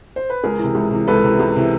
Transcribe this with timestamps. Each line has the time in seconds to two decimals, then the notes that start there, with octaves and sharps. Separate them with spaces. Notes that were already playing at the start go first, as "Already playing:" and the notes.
0.16 C5
0.30 B4
0.44 C#2 G#4 A#4
0.59 C3 E3
0.75 C#2
0.91 C3 E3
1.07 C#2 A4 B4
1.23 C3 E3
1.39 C#2
1.56 C3 E3